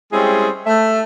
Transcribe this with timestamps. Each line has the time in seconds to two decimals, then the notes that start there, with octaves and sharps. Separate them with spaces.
0.13 G3 G#3 C4 C#4 E4 G#4
0.67 A3 E5